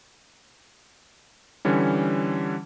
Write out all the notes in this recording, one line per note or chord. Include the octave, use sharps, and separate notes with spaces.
D3 E3 G3 C#4